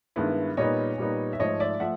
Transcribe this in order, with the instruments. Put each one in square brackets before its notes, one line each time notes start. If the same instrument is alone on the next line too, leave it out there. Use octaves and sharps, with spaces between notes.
[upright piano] G2 D#3 G#3 B3 E4
A#2 G3 B3 D#4 C#5 D#5
A#2 G3 B3 D#4
E5
G#2 F3 A3 C#5 D#5
D5 E5
F3 A3 E5 F#5